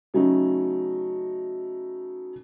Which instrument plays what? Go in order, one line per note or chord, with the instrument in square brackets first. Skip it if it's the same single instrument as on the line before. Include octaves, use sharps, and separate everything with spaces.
[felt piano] C#3 F#3 A3 D#4